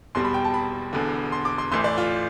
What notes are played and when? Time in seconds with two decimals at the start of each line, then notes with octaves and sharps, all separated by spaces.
0.15 E1 E2 B2 G3 C6
0.25 B5
0.34 G5
0.44 A5
0.54 B5
0.93 E1 E2 D3
1.32 C6
1.45 D6
1.58 C6
1.72 A1 A2 E3 C6
1.84 D5
1.98 F4